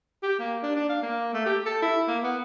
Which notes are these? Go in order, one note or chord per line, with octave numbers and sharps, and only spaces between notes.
G4
A#3
D4
D4
F5
A#3
A3
G4
A4
E4
A#3
B3